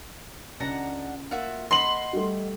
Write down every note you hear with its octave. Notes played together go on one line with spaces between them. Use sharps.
C#2 D4 F#5 A#5
A#3 F4 F#4 E5
D#5 F#5 B5 C6 F#7
G3 A3